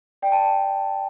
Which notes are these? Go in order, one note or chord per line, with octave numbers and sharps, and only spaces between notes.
D5 G5
A5